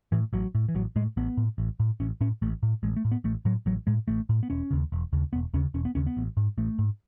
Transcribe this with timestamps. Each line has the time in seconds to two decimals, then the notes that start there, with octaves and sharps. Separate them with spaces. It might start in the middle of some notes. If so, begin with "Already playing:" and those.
0.12 A2 E3
0.33 A1 F#3
0.55 A2
0.68 E3
0.75 A1 F#3
0.96 A2 G#3
1.17 A1 B3
1.37 A2
1.58 A1
1.80 A2
2.00 A1 C#4
2.21 A2 C#4
2.42 A1 A3
2.63 A2
2.83 A1 G#3
2.96 A3
3.05 A2
3.12 B3
3.24 A1 A3
3.45 A2 F#3
3.66 A1 F#3
3.87 A2 G#3
4.08 A1 A3
4.29 A2
4.43 B3
4.50 E1 C#4
4.71 D#2 C#3
4.92 E1
5.13 D#2 C#3
5.33 E1 B3
5.54 D#2 C#3 C#4
5.74 E1 C#4
5.85 B3
5.95 D#2 C#3 C#4
6.07 B3
6.17 A1
6.37 G#2
6.58 A1 A3
6.79 G#2